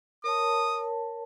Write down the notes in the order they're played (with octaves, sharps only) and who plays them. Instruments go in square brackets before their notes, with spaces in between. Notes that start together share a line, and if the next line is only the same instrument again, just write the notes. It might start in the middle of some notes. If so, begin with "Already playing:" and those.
[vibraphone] A#4 C#5 A5 [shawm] D#6